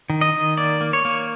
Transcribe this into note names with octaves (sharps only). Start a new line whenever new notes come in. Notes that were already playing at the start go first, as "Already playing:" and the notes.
D#3
D#5
D#3
A#3 D5
A#3
C#5
A#3